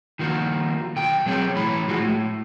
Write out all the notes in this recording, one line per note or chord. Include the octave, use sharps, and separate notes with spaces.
D#3 F3 A#3 F#4
B1 D3 G5
B2 F#3 C4 G#4 C#5 G5
A2 E3 E4 B5
F3 G#3 F#4
A2